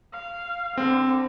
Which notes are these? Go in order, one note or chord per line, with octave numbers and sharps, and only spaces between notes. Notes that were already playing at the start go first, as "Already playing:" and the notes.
F5
D3 C4